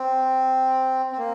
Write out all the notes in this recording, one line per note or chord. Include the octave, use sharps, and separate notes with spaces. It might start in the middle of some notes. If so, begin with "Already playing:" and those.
Already playing: C4
C4
A#3